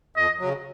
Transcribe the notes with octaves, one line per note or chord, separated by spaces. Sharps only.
F2 D#5
C#3 F#3